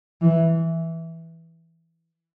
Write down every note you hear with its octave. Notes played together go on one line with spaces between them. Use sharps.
E3